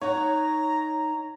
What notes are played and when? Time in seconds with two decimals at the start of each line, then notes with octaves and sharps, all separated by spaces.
0.01 D#4 C#5 F#5 A#5